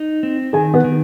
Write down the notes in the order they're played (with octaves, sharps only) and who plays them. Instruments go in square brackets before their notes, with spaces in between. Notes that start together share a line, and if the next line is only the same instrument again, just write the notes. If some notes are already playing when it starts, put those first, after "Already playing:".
Already playing: [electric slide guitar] D#4
C4
[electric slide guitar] D#3 [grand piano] G#4 G#5
[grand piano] B3 B4
[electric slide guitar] D#3